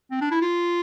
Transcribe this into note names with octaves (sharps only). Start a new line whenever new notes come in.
C4
D4
E4
F4